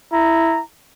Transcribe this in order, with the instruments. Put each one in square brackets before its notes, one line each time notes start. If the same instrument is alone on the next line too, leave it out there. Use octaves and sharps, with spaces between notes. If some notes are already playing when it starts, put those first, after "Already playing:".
[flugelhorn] E4 [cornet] A#5